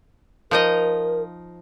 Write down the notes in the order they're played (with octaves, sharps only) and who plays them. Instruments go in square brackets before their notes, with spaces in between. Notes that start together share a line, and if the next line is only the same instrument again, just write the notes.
[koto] F3 D#4 D#5 [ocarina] A#4